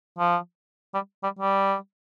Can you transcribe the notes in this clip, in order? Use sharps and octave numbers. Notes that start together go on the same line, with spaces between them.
F3
G3
G3
G3